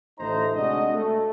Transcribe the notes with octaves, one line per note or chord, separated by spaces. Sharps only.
A1 D3 A3 D#4 C5 A#5
C3 G#3 D4 F#4 D#5
A3